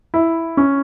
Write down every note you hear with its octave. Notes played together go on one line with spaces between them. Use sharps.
E4
C#4